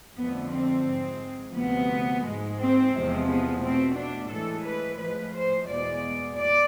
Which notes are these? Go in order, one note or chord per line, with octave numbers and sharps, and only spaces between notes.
F2 D3 F3 A3 B3
C4
G#2 G#3
D2 C3 F3 B3
G#2 G#3
C4
E2 C3 F3 G#3
B3
B2 A3 C4
D4
A2 E3 G#3 A4
B4
A2 F3 G#3 B4
C5
E2 B2 G#3 D5
D5